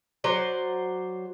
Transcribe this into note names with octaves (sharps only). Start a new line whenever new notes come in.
F#3 C5 D5